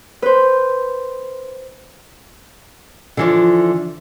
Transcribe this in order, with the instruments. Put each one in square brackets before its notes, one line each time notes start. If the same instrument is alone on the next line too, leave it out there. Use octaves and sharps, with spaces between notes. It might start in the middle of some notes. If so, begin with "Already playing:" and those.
[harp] B4 C5
[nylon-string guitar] D3 E3 F3